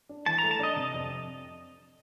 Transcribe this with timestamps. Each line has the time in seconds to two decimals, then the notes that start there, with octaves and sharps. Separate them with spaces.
0.09 D4
0.26 E3 A5
0.38 A#5
0.43 A3
0.51 A5
0.60 D4 D#5
0.76 C3 D#5
0.94 F2